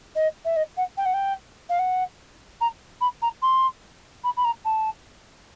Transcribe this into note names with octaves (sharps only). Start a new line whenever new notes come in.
D#5
E5
D#5
F#5
G5
F#5
G5
F5
F#5
A#5
B5
A#5
C6
B5
B5
A#5
A5